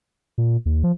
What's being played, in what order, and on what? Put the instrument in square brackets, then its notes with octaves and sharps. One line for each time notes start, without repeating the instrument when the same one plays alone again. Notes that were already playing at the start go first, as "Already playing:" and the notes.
[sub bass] A#2
D#2
F3